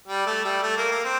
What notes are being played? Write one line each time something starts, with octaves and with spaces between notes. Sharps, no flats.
G3
A3
G3
A3
A#3
A#3
C4